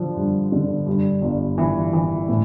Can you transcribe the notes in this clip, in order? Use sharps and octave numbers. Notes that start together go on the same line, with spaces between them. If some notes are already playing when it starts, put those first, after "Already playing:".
Already playing: D3 F3
G2
D3
G2
G1
E3
E3
A2